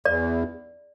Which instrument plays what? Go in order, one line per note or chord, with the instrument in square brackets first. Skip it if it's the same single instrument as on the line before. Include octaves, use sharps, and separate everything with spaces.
[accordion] E2 [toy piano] D5